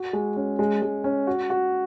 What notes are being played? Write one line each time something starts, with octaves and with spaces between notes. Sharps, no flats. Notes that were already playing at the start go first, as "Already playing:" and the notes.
Already playing: F#4
G#3
C#4
G#3
G#3
C#4
F#4
F#4